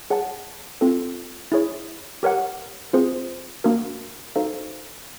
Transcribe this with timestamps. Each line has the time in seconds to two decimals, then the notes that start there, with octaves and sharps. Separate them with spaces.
0.10 G#4 C#5 F#5 A5
0.81 C4 F4 A4
1.52 E4 G#4 C#5
2.23 G4 A#4 C#5 F#5
2.93 C4 F4 G#4 C5
3.64 A#3 D4 F#4 A#4
4.36 D#4 F#4 A4 C5 F5